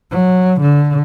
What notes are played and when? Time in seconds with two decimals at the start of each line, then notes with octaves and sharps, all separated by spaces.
0.11 F#3
0.61 D3